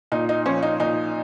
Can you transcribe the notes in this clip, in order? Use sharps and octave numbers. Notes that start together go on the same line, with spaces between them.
A#2 D#4
D#4
F3 C#4
D#4
A#2 D#4